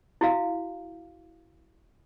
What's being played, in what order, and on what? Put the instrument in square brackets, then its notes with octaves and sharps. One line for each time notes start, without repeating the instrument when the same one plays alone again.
[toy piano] E4 F#4 F5